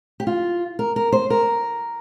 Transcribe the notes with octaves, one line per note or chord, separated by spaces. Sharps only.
G4
F4
A#4
A#4
C5
A#4